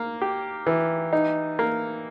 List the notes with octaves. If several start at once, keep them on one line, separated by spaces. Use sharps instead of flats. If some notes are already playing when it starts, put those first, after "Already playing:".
Already playing: A#3
G4
E3
D#4
A#3